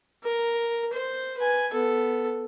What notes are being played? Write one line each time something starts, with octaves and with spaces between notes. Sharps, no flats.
A#4
C5
B4 G#5
B3 A4